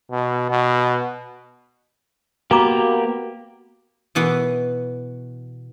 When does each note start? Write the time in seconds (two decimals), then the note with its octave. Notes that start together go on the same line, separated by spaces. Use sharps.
0.11 B2
0.50 B2
2.51 A#3 B3 F#4 G4 A#5 D6
4.15 B2 E3 B3